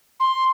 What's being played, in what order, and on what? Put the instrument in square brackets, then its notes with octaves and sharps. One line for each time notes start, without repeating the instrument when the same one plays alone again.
[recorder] C6